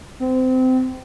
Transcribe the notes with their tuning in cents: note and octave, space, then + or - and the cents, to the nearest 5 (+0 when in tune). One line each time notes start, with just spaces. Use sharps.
C4 -25